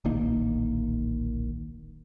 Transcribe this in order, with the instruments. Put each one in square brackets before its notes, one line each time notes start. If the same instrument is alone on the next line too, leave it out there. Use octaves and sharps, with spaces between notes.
[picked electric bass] D1 A#1 D#3 A#3